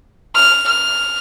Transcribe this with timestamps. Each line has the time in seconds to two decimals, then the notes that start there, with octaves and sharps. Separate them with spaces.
0.35 F6
0.67 F6